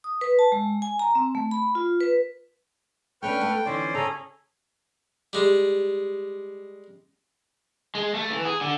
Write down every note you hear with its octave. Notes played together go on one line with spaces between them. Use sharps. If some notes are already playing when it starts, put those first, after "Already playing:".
D#6
B4
A5
G#3
G#5
A#5
C4
A3
B5
F4
B4
A3 C#4 D4 B4 G5 C#6 F6
A3 A4 F#5
D3 E3 C#4 D#4 C5 D5
C#3 C#4 G#4 A4 A#5
G3 G#3
G#3
A3
E3
G#4
D3